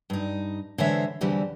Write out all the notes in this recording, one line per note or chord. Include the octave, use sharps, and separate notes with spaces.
G2 D#4
D3 E3 G#3 C5 C#5 E5
E2 D3 E3 G3 C4